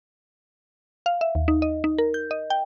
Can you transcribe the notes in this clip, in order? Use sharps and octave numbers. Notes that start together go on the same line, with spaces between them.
F5
E5
D#2
D#4
D#5
D#4
A#4
G6
D#5
G5